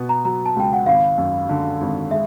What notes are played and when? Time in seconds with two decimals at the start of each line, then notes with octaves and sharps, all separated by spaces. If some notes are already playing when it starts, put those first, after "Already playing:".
Already playing: B2 B3
0.09 A#5
0.25 F#3 A#5
0.46 A5
0.56 C#2 G5
0.73 F#5
0.86 G#1 F5
1.18 F#2
1.49 D3
1.81 G#1
2.11 G#3 E5